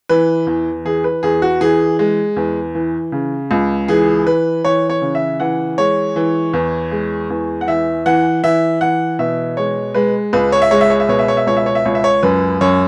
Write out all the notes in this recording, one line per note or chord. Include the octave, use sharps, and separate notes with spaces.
E3 B4
E2
E3 G#4
B4
E2 G#4
F#4
E3 G#4
G#3
E2
E3
C#3
C#2
E3 G#4
E3 B4
E3 C#5
C#5
C#3
E5
E3 F#5
G#3 C#5
E3
E2
G#3
E2
F#5
E3 E5
E3 F#5
E3 E5
E3 F#5
B2 E5
G#3 C#5
G#3 B4
C#2 B4
C#5
E5
G#3 C#5
E5
C#5
E5
B2 C#5
E5
C#5
E5
C#2 C#5
E5
C#5
E5
C#2 C#5
E5
C#5
F#2 B4
F#2 C#5